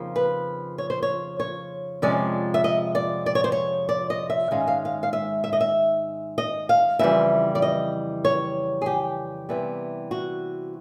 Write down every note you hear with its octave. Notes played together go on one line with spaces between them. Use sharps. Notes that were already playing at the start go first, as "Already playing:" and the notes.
Already playing: F2 C#3 F3 A#3 D#4
B4
C#5
C5
C#5
C#5
F2 C3 F3 G#3 C#4 D5
E5
D#5
D5
D5
C#5
C5
C#5
D5
D#5
E5
G#2 D#3 G#3 C#4 F5
F5
F5
F5
E5
E5
D#5
E5
D#5
F5
F2 C#3 E3 G3 C4 E5
D5
D#5
C#5
G#4
G4
C3 E3 G3 B3
F#4